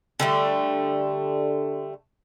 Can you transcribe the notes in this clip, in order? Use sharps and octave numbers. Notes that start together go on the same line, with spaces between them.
D3 G3 A3